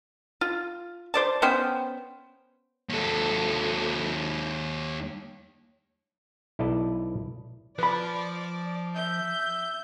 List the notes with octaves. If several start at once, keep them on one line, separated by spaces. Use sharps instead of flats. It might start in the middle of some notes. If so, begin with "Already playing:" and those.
F4
C5 D5 A5
B3 C#4 C5 G5
D#2 A4
B1 E4 D5 D#5 A5
F3 B4 D5 B5
E5 G6